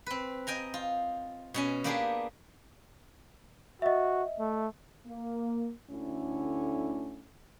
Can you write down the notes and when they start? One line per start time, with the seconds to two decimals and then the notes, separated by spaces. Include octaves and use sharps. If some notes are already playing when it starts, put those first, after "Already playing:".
0.06 C4 B4
0.47 D#5 G5 G#5 A#5
0.74 F4
1.54 B2 C#4 G#5
1.84 A#3 B3 D4 G4 G#4
3.82 F#4 D#5 E5
4.39 A3
5.06 A#3
5.90 D2 D3 A3 C#4 E4